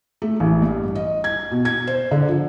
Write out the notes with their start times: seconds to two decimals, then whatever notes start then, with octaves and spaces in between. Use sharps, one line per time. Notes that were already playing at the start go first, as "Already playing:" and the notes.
0.22 A3
0.40 A1
0.62 G2
0.95 D#5
1.24 G#6
1.51 B2
1.65 G#6
1.87 C5
2.11 D3
2.28 F3